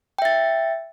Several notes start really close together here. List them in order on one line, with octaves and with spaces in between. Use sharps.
G5 E5 A6